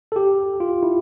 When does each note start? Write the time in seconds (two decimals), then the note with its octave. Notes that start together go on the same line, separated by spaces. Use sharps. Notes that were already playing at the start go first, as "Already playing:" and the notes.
0.12 A4
0.16 G4
0.60 F4
0.83 E4